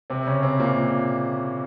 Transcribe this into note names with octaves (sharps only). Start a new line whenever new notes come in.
C3 C4
C#3 C#4
C3 C4
A#2 A#3